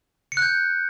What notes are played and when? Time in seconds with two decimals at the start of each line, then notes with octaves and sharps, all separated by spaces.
0.32 C#7
0.37 F#6
0.42 G6